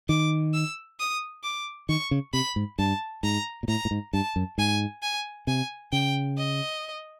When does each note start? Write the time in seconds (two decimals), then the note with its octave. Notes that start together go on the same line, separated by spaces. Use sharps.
0.09 D#3 D6
0.54 E6
0.99 D#6
1.43 D6
1.89 D#3 C#6
2.11 C#3
2.33 C3 B5
2.56 G#2
2.79 G2 A5
3.23 G#2 A#5
3.63 A#2
3.68 A2 A#5
3.85 A2
3.91 G#2
4.13 G2 A5
4.36 F#2
4.58 G#2 G#5
5.03 G#5
5.47 C3 G#5
5.92 C#3 G5
6.38 D#5